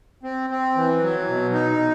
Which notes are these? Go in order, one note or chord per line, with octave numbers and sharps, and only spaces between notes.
C4
C4
E3
F#3
B2
D#4